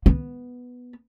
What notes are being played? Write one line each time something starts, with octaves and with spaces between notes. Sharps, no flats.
B3